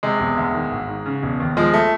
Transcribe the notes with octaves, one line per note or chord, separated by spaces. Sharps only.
C3 G#3
E1
D2
D#3
G#1
G#2
C#3
E1
D#2
F3 G#3
A3